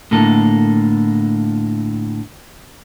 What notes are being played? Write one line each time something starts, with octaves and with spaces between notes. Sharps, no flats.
A2 D3 A#3 A4